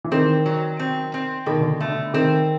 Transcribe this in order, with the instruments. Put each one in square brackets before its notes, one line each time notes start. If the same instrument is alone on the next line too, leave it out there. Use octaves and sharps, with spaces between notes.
[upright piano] E3
[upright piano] D#3 [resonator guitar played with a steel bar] C4
[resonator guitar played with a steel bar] F#3
C4
C4
[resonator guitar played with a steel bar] B2 [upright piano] D#3
[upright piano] D3
[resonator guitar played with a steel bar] A3
[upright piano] D3
[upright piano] D#3 [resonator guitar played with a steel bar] C4